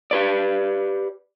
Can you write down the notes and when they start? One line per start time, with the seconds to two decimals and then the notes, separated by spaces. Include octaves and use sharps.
0.11 G4 B4 D5